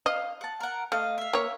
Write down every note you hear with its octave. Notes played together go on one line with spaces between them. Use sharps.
D#5 F5
F#5 A5
A#4 F#5
A3 D#5 F5
E5 F5
A#3 C#5